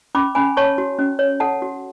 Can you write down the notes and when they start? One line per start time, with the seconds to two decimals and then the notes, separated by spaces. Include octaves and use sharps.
0.15 C#4 B5 D6
0.35 C#4 G#5 B5
0.57 C#5 A5 C#6
0.78 F#4
0.99 C#4
1.19 C#5
1.40 A4 F#5 A5
1.62 F#4